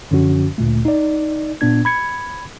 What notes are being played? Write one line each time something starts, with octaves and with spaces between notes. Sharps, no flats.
F#2 D3 F3 C#4 F#4
D2 A#2 A3
D#4 D5
A#2 B3 D4 G#6
B5 G#6 C#7